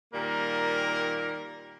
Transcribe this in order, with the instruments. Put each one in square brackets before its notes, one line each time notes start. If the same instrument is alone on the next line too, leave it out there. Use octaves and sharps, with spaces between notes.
[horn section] A#2 D#3 G3 A#3 A#4